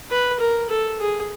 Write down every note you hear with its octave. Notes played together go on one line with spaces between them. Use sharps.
B4
A#4
A4
G#4